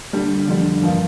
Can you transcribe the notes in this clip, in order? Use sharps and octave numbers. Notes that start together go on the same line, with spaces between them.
D3 G3 D4
F2 D3 G3
G2 F3 A#3 F4